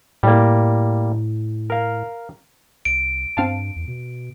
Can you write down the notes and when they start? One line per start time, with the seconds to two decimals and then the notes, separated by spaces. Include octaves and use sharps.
0.23 A2 G3 A#3
1.70 A#4 F5
2.85 C2 D7
3.37 G2 C4 F5 A5
3.76 E2
3.88 B2